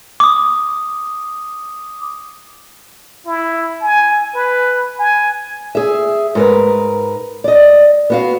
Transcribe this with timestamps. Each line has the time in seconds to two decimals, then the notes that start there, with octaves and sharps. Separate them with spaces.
0.20 D6 D#6
3.26 E4
3.81 G#5
4.35 B4
4.99 G#5
5.75 G#4 E5
6.35 G#2 A#4 B4
7.44 D5 D#5
8.10 B3 F#4 F5